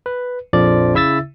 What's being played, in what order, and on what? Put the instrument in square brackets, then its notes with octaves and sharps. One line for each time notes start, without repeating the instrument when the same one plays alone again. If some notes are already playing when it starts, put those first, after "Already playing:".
[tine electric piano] B4
A#1 F2 F3 D5
C#3 E4 E5 E6 A6